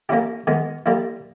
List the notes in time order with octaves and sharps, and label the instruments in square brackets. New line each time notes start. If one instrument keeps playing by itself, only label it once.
[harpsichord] A#3 C#4 E4 G4
D#3 G#3 B3
G3 A#3 E4